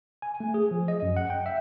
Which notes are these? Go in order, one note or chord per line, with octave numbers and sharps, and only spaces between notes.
G#5
A3
G#4
F3
D#5
F#2
F#5
G5
E5